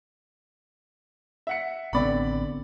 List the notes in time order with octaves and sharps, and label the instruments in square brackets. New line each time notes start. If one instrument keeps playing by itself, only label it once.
[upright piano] E5 F#5 C#7
[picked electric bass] A1 B3 C4 [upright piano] D3 D5 B5